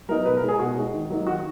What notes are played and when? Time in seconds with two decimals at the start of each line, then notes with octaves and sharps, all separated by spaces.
0.08 F#3 B3 D#4 A#4
0.26 B2 B4
0.37 A#4
0.43 G#3 D#4
0.48 G#4
0.59 B2 F#4
0.76 G#3 D#4
0.94 D#3
1.10 F#3 A#3 D#4
1.27 D#3 F#4